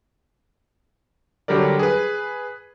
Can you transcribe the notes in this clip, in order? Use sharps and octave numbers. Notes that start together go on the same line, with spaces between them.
D3 F#3 G3 G4 A#4 D5
G#4 B4